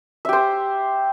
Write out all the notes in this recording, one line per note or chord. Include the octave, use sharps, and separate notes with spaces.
G4 C5 E5